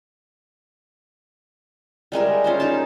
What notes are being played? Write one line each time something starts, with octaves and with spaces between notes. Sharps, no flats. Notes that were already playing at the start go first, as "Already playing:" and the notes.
G3 G#3 A#4 E5
C#4 F4 C5
D#4 A#4 A5